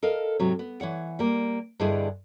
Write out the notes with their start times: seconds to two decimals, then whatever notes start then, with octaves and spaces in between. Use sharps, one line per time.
0.03 A4 A#4 D#5 F5
0.39 G#2 C3 F#3
0.59 B3
0.81 E3 C#5 F#5
1.19 G3 A#3
1.80 G2 D3 E4 G#4 D#5